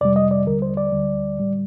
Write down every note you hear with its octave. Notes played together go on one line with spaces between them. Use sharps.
F2 C3 G3 D5
D#5
D5
D#2 D3 G3 A#4
C5
D5
D2 D3 G3
A2 G3